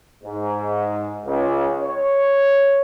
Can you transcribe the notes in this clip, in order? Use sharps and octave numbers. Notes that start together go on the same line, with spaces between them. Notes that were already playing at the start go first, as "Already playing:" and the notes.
G#2
C#2
C#5